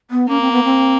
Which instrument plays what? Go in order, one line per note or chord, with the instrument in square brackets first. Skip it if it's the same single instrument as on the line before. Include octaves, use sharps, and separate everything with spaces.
[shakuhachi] B3
[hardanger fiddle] A#3 [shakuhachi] C#4
[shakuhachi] C4
B3
C4